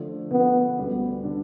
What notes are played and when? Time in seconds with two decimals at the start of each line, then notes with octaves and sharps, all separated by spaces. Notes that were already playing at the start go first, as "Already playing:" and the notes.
Already playing: D3 F3 A3
0.31 D3 F3 A3 B3
0.77 D2 D3 G3 B3 D4
1.23 D3 G3 B3 D4